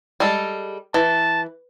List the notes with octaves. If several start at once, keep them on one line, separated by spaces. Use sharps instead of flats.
G3 G#3 A4
E3 A5